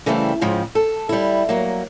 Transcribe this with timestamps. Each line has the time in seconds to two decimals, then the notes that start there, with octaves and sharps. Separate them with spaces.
0.06 C#3 E3 G3 A3 C4
0.41 G#2 C#3 F3 C4
0.75 A4
1.09 G3 E4
1.49 F#3 A#3